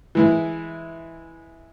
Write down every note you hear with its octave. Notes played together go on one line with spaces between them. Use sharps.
E3 G#3 E4